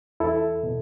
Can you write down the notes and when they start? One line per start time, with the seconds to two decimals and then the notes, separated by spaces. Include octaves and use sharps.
0.20 E2 E4 A4
0.63 B2